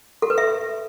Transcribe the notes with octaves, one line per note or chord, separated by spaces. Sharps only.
A4
B4
E5